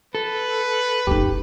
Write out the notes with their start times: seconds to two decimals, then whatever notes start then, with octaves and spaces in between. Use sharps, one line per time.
0.15 A4 B4
1.07 F#1 D#4 G4